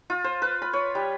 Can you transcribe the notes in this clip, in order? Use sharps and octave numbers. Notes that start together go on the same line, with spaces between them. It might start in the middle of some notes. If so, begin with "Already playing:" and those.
F4
C5
B4
B5
C#5
G3